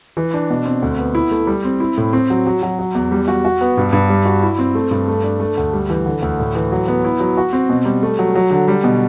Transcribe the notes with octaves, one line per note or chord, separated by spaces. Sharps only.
E3
D4
B2
C4
D2
B3
E4
A3
G3
C4
E4
A2
C4
F#3
F#3
F#3
F#3
E2
G3
F#4
F#4
B3
G2
G2
G3
F#4
E4
C4
A3
G2
A3
D4
A3
D2
G3
E3
D3
D2
A2
E3
F#3
B3
E4
F#3
F#4
C4
B2
G3
A3
F#3
F#3
D3
G3
B2